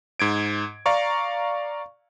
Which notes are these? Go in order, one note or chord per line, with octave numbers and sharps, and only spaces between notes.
G#2 G#6 D7
D5 F5 A#5 C#6